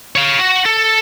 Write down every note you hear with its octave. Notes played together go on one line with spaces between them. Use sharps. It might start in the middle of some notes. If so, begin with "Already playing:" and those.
C#5 F5
F#4
A4